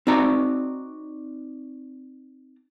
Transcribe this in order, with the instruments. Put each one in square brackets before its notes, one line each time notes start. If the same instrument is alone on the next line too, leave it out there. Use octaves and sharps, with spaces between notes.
[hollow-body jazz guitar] C4 D#4 F#4 D5 A#5